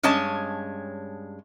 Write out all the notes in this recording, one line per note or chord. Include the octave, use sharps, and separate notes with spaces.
G2 G#3 C#4 C#5 D#5 A5